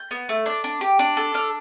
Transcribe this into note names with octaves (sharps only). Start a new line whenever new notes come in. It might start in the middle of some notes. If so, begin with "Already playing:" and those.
Already playing: G6
B3
A3
D4
D4
G4
D4
A4
D4 F6